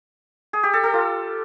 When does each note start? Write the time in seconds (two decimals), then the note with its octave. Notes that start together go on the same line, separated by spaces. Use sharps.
0.53 G#4
0.63 G4
0.73 A4
0.83 A4
0.94 F4